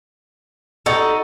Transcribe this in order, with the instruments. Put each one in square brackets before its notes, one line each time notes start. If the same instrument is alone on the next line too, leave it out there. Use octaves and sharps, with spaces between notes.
[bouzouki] D#4 A4 [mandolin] F#4